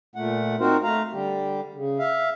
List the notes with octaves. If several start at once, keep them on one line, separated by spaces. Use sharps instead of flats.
A#2 A3 F#5
C4 D#4 F#4 A#4 C5
A3 F5 A#5
D3 G3 G4
C#3
E5 F5